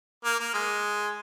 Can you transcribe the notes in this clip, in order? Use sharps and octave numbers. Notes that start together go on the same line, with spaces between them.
A#3
A#3
G#3